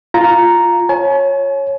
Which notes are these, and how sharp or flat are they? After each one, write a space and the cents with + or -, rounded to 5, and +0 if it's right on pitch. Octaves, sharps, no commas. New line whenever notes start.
F4 +0 A#5 +0
C#5 -10 G#5 +45